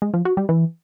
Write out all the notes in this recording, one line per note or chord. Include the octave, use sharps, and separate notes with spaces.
G#3
F3
F#4
G3
E3